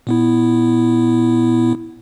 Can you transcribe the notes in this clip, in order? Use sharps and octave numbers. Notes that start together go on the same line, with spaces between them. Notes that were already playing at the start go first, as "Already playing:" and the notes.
A#2 B3 E4